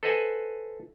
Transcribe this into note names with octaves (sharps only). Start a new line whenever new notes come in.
A4 B4 C5 D#5 F#5 G#5